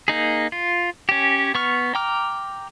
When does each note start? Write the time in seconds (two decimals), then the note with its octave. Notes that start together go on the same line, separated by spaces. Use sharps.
0.08 A#3 D#4 G#4
0.52 F4
1.09 C#4 G4
1.55 B3 C#6 F6
1.95 G5 A#5 D6 F6